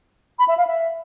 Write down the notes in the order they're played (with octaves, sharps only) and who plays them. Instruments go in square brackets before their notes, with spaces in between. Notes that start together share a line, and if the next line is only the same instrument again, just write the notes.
[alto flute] B5
E5
F5
E5